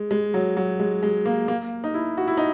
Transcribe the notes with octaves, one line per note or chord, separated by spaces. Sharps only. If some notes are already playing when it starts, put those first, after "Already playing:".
Already playing: G#3
G#3
F#3
F#3
G#3
G#3
A#3
A#3
D#4
E4
F#4
E4
D#4